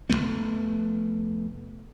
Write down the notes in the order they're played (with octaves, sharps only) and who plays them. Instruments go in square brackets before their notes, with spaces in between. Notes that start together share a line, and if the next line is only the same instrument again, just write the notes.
[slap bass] F1 F#2 A3 B3